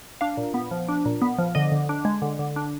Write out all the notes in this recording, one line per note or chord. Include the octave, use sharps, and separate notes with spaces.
D4 F5
A#2
B3
F3
D4
A#2
B3
F3
D3 D#5
D3
D4
G#3
D3
D3
D4